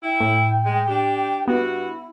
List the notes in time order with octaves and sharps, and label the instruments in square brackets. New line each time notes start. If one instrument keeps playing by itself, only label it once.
[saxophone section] E4 [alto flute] G5
[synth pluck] A2
[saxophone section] G#3
D4 G4
[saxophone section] G2 F#4 [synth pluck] B3 [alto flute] E4